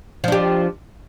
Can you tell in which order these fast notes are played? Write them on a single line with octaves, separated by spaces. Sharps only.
F3 D4 G4